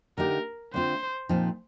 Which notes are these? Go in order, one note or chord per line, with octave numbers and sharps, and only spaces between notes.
D3 A3 D#4 G4 A#4
D3 A3 C4 F4 C5
A#2 F3 C4 D#4